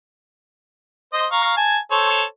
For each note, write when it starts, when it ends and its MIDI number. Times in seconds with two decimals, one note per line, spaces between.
1.13 1.26 72
1.13 1.26 75
1.32 1.52 77
1.32 1.52 82
1.32 1.52 85
1.57 1.78 80
1.57 1.78 81
1.91 2.24 69
1.91 2.24 72
1.91 2.24 73